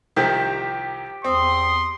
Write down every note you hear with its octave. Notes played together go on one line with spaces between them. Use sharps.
C2 D#3 F3 G4
E2 C4 C6 D#6